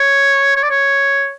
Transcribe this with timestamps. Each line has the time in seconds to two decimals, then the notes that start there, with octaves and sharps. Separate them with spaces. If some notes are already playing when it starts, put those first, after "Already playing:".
Already playing: C#5
0.56 C#5
0.63 D5
0.70 C#5